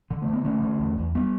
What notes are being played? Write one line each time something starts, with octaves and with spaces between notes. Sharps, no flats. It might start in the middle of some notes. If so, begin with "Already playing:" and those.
D3
A3
D3
B3
D3 A3 C#4
D3
E2
E2
G3 B3